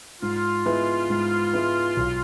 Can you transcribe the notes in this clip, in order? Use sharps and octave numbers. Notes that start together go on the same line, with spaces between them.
G#2 F4
G#3 B3 E4 B4
G#2
G#3 B3 E4 B4
B1